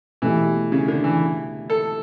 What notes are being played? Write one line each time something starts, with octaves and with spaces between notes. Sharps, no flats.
B2 E3 A3 E4 G4
C#3
D3
E3
A4